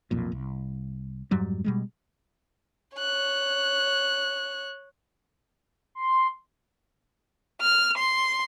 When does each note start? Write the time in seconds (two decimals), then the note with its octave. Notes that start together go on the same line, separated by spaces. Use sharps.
0.11 B1 F2 A#2
0.32 C2
1.31 F2 G#2 F#3 G3
1.64 B2 G3 G#3
2.97 C#5 F#6
5.95 C6
7.61 F6
7.97 C6